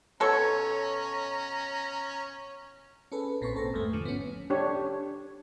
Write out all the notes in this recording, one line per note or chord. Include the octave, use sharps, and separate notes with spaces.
B2 C#4 A4 C#5 A#5
C#4 G#4 A4 B4
A#1 A#2 C4 B4 C5 C#6
G#1 A4 C5 A#6
E2 G#2 A3
G#2 D3 F3
B3 C#4
D4 G4 C#5